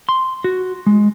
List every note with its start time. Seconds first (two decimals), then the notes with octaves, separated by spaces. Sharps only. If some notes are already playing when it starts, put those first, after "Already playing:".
0.09 C6
0.44 F#4
0.86 G#3